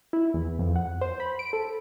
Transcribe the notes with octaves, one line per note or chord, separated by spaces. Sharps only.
E4
E2
F2
F#5
C5
B5
D7
A4